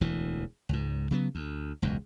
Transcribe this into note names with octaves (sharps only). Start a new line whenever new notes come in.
E1 D2 E3
C#2 G#2
C#3 F#3 B3
D2
E1 C#2 F#2